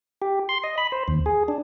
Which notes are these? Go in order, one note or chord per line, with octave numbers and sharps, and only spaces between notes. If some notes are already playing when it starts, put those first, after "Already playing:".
G4
C6
D#5
B5
C5
D#2
G#4
D4